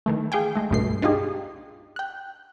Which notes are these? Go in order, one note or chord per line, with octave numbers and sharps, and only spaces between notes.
D#3 E3 A3
G#4 F5 G5 G#5
G#3 A3
C#2 G2 B2 A3 C7
D4 D#4 F4 G4 G#4
G5 F#6